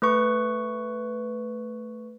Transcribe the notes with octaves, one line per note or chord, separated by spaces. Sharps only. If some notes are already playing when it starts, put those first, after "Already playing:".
A3 B4 C#6